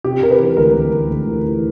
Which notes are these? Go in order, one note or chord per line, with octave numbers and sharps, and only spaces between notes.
C3 G4
C3 A#4
B4
E3
D2 A#4
D2
D2
D2
E3
E3